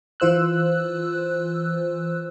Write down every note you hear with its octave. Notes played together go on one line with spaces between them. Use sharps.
E3 F4 C5 E6 F#6